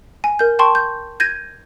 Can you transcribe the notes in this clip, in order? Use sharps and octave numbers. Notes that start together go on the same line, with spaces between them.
G#5
A#4 G6
G5 A5 C6 C#6
G6
G6 G#6 A#6 D#7